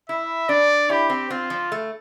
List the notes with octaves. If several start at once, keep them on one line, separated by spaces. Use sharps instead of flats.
E4 E5
D4 D5
E4 G4
C4
C4 F4
F3
A3